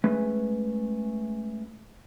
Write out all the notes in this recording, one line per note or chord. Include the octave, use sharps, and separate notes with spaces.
G#3 A3 C#4 B4